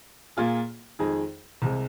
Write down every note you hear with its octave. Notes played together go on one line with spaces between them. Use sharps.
A#2 A#3 F4 G#4
F2 D#3 G#3 D#4 G#4
C2 C3 G#3